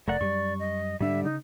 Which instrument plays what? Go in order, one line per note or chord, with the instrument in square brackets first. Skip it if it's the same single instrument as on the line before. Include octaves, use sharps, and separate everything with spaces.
[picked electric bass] F1 [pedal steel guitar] A3 A#4 F#5 [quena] D5
[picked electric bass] F#2 G3 [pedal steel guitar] C#6
[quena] D#5
[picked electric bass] G#2 D4 [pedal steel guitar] D3 G3 [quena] E5
[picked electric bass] C#3 [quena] D#4